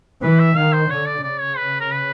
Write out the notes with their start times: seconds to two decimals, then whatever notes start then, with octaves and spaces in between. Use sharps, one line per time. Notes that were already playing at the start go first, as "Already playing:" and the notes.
0.22 E3 B4
0.39 E5
0.56 D#3 F5
0.73 C5
0.90 D3 C#5
1.06 D5
1.23 C#3 D5
1.40 C#5
1.57 B4
1.80 A#4
1.91 B4